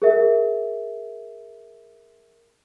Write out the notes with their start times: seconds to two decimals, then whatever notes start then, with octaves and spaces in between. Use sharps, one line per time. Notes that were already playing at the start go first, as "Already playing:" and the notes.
0.02 G#4 A#4 E5